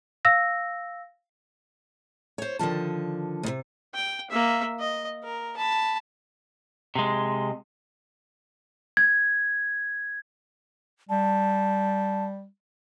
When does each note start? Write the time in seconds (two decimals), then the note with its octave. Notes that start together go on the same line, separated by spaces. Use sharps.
0.25 F5 E6 A#6
2.38 C5 C#5
2.59 D3 D#3 F3 A5
3.43 D#2 C3
3.95 G5
4.30 A#3 E5
4.79 D#5
5.23 A#4
5.57 A5 B5
6.95 C3 G#3
8.97 G#6
11.09 G3 A5